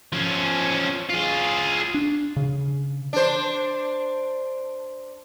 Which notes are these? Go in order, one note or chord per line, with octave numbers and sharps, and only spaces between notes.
F3 C#4
F4 G#4
D4
C#3
D4 C5